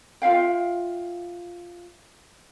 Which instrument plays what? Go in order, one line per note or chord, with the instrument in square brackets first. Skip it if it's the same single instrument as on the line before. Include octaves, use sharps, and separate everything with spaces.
[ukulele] F4 E5 F5 G5